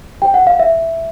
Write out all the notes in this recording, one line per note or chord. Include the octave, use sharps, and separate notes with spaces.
G4 C5 G5
F#5
F5
E5